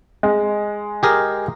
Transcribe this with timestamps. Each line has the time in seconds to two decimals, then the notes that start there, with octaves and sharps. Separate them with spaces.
0.23 G#3
1.03 G4 G#4 A#4